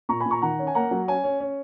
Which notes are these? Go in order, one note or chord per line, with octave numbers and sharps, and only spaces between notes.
A#2 A#5 C#6
G#5 B5
A#2
A#5 C#6
D#3 F#5 A#5
C#4
G#5
A#3 F#5 A#5
F#3
C#4 G#5
C#4
C#4